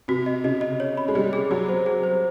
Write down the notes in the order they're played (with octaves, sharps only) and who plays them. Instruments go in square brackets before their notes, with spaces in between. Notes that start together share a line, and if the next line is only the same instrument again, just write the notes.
[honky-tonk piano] C3 [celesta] F#4
[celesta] D#5
[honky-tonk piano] C#3 [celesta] D#5
[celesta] D#5
C#5
B5
[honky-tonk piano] G#3
[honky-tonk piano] G3 [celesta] G#4
[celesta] G#4
[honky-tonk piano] F#3 [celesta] G#4
[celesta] C5
G#4
C5